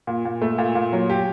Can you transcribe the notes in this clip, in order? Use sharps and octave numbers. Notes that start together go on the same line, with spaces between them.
A#2
A#2
A3
A#2
A#2
F#3
G4